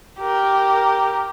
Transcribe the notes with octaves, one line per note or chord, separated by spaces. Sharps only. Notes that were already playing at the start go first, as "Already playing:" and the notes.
G4 A#4